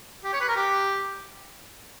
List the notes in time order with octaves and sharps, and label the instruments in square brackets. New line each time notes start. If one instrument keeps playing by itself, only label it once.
[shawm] G4
C#5
B4
A#4
G4